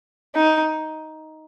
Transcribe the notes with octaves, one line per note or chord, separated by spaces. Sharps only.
D#4